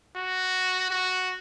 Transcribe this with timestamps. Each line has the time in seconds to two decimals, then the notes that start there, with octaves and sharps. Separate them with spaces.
0.16 F#4
0.91 F#4